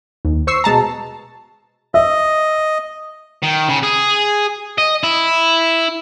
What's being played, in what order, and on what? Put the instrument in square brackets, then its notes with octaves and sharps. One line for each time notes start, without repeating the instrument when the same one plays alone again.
[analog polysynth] D#2
C5 C#6 E6 C7
B2 G#3 A5 A#5
[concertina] D#5 [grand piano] E5
[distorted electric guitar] D#3
C#3
G#4
D#5
E4